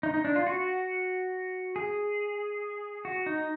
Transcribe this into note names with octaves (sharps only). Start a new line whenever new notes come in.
D#4
D#4
D4
F4
F#4
G#4
F#4
D#4